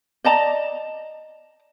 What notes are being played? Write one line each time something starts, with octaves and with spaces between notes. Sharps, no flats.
D5 D#5 A5 A#5